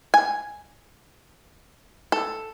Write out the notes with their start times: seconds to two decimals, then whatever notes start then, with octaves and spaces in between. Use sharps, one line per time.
0.14 G#5
2.12 A4